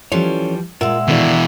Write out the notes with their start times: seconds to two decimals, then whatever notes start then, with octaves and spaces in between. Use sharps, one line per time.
0.12 E3 F3 G3 C#4 A4 C#5
0.81 A#2 G#3 F4 A#4 E5 F#5 E6
1.08 B2 D#3 E3 A4 D5